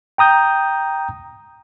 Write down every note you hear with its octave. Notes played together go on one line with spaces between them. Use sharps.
G5 A#5 D#6 G6